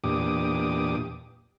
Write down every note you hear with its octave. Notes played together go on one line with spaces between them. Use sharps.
E2 A#2 D4 G4 D6 D#6